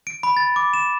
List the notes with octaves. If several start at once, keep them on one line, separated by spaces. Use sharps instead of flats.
D7
B5
A6
D6
E7